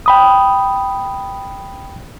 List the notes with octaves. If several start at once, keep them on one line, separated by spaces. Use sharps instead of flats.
G5 B5 D#6